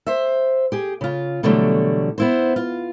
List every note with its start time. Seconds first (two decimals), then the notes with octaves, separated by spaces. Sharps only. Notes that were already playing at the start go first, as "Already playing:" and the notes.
0.07 C5 E5
0.72 G4 G#4
1.01 C#3 F4
1.43 B2 D3 E3 F#3 G3 A3
2.18 B3 E4 C5
2.56 F4